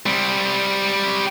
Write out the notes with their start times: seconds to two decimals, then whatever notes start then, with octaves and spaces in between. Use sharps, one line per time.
0.06 G3 C4